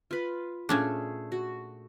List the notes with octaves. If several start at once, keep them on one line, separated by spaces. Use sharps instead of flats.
F4 B4
A#2 A3 C#4 D4 G#4
F#4